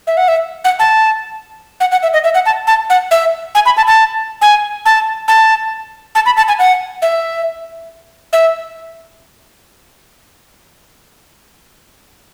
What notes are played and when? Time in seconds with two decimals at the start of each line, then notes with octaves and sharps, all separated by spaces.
0.07 E5
0.17 F#5
0.28 E5
0.65 F#5
0.79 A5
1.80 F#5
1.92 F#5
2.03 E5
2.13 D#5
2.24 E5
2.35 F#5
2.46 A5
2.67 A5
2.90 F#5
3.11 E5
3.55 G#5
3.66 B5
3.77 A5
3.87 A5
4.42 G#5
4.86 A5
5.28 A5
6.15 A5
6.26 B5
6.37 A5
6.48 G#5
6.59 F#5
7.02 E5
8.33 E5